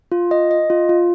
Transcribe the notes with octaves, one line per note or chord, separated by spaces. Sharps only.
F4
D#5
D#5
F4
F4